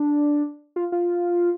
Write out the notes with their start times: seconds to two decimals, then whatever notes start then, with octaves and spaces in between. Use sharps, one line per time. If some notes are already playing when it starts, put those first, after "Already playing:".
Already playing: D4
0.76 F4
0.92 F4